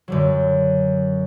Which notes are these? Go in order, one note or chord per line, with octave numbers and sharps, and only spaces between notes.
F#2 D3 F#3